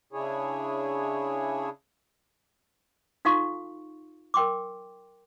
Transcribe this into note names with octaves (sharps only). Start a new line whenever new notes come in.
C#3 D4 E4 G#4 C#5
D#4 F4 A4 F5 C6 C#6
A#4 G5 C6 D6